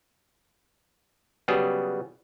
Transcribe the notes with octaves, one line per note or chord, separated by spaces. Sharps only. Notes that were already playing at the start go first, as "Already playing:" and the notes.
C#3 F#3 G3 B3 G#4